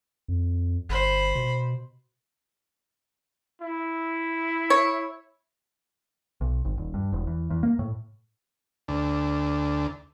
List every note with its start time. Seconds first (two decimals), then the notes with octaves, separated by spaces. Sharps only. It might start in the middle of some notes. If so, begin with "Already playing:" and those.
0.28 F2
0.89 G1 C5 B5
1.35 B2
3.62 E4
4.70 C#5
6.41 B1
6.65 G#1
6.78 D#1
6.94 G2
7.13 E1
7.27 E2
7.50 E2
7.63 A#3
7.79 A2
8.88 D2